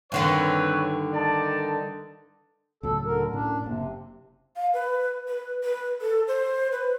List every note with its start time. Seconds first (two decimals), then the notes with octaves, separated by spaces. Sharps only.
0.12 G2 D3 D#3 C4 B4 C#5
1.14 D#4 D5 A5
2.83 C#2 A2 F#3 A4
3.05 D3 A#4
3.33 A2 C#4 D4
3.64 F#1 C3 A#3
4.56 F5
4.74 B4
5.28 B4
5.64 B4
6.01 A4
6.28 C5
6.72 B4